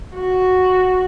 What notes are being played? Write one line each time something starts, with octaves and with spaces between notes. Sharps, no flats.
F#4